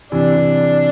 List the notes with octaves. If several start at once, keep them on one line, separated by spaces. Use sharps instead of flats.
C3 E3 D4
C3